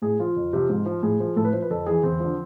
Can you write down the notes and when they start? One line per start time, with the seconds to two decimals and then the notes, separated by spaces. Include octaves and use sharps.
0.02 A2 G#4
0.20 F3 F4
0.36 F2
0.53 C3 F3
0.69 G#2
0.86 F3
1.03 A2 G#4
1.20 F3
1.36 A2 A4
1.44 B4
1.53 F3 C5
1.62 B4
1.70 F2 A4
1.86 E3 G#4
2.03 E2 C4
2.20 D3 F3